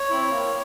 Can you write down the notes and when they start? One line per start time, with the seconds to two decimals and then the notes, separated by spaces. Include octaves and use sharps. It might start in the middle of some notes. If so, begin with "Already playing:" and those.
Already playing: C#5
0.10 C4 E4
0.31 A#3